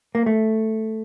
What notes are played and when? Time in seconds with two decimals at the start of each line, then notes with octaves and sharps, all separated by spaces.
0.15 A#3
0.26 A3